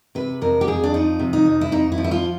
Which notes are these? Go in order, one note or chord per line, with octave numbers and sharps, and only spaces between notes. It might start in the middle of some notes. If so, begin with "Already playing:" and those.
C3 B4
F2 A#4
G4
F2 G#4
D4
F3 D#4
C3
D#4
F2
E4
F2 D#4
E4
F3
E4
F4